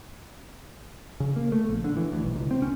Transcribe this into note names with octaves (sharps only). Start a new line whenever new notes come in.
C#3
A#3
A3
A#1
D3
E3
D2
B1
C#2
C4
C#4